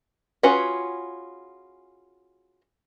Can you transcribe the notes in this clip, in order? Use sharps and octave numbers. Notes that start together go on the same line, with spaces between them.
C#4 F4 F#4 G#4 B4